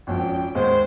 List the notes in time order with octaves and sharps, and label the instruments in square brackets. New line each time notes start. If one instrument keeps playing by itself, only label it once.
[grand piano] G#1 F2 [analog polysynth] C#4 [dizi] G5
[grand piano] D#2 G#3 [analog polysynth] G#2 B3 [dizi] C5